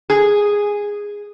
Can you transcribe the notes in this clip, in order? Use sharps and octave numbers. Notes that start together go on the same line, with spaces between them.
G#4